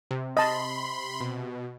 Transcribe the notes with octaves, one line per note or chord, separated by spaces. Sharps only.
C3
D#5 A5 B5 C6
B2